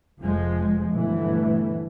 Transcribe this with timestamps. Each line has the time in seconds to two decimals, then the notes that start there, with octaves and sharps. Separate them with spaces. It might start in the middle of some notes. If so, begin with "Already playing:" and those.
0.20 F1 F2 F3 G#3
0.90 G1 B2 E3 A3